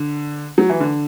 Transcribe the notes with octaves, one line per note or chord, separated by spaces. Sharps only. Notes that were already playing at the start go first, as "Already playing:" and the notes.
Already playing: D3
F#3
E3
D3